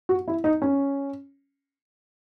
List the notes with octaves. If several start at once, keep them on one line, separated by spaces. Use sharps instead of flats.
F#4
E4
D#4
C#4